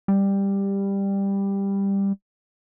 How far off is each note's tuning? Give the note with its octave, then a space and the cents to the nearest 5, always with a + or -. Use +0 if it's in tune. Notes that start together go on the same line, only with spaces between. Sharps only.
G3 +10